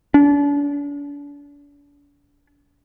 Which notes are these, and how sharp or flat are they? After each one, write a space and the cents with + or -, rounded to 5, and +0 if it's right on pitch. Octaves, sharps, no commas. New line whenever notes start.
D4 -40